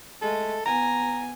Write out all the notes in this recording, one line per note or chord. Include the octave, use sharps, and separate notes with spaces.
G#3 A3 A4
B3 G#5 A#5